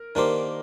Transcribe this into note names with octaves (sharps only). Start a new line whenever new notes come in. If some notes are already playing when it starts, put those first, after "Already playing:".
Already playing: A#4
D#3 A#3 D4 G4 A#4 C5